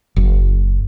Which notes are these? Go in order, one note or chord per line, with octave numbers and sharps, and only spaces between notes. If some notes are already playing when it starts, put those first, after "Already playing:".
F#1